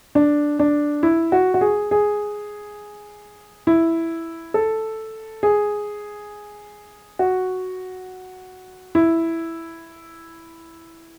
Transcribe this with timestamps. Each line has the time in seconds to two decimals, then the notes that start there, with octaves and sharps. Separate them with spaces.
0.15 D4
0.59 D4
1.03 E4
1.32 F#4
1.54 F#4
1.61 G#4
1.91 G#4
3.67 E4
4.54 A4
5.43 G#4
7.19 F#4
8.95 E4